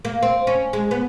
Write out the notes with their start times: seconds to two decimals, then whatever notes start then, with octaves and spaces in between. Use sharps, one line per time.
0.05 A#3
0.22 C4
0.47 C#4
0.73 G#3
0.91 B3